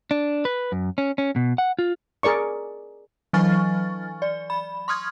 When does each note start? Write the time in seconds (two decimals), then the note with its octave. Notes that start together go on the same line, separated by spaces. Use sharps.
0.11 D4
0.45 B4
0.72 F#2
0.98 C#4
1.18 C#4
1.36 B2
1.58 F#5
1.79 F4
2.23 G#4 A#4 D5 C#6
3.33 E3 F#3 G#5 C#6 F6 A6
4.22 D5
4.50 B5
4.88 C6 C#6 D#6 F6 G#6